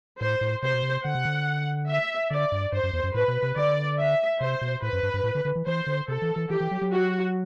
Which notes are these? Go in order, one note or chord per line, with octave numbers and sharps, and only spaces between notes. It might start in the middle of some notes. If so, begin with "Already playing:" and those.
A2 C5
A2
C3 C5
B2
C3
D3 F#5
C3
D3
E5
D3 D5
G2
G2 C5
F#2
E2
F#2
A2 B4
B2
C3
D3 D5
E5
C3 C5
B2
A2 B4
F#2
G2
G2
A2
D3
D3
E3
E3 C5
D3
C3 A4
E3
E3
E3 G4
E3
F#3
F#3
F#4